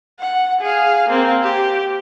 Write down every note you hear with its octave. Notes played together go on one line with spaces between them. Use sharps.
F#5
G#4 F5
A#3 C4
G4